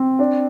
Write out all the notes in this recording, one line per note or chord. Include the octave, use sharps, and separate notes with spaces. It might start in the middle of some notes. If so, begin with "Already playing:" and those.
Already playing: C4
D4